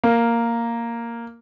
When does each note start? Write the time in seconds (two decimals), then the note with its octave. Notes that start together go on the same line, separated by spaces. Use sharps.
0.04 A#3